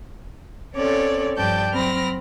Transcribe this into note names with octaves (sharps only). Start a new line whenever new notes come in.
C4 C#4 A4 C#5 D5
G2 F3 D5 G5 A5 G6
F#3 C4 B5 F6 A#6